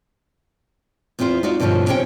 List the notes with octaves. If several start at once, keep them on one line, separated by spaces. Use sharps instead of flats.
E2 C4 E4 F4 C5
D#4 F4 F#4 D5
G2 B2 D3 F3 C#4 F4
C3 C#4 C#5 G5